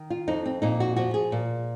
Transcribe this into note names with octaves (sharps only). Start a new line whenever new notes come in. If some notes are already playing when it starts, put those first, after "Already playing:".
Already playing: D#3
F4
F2 D#4
C4
A#2 D#4
F#4
F3 F#4
G#4
A#2